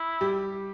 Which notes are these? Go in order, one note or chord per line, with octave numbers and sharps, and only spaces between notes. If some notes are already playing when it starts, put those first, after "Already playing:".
Already playing: E4
G3 G4